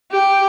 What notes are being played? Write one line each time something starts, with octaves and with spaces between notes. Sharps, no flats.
G4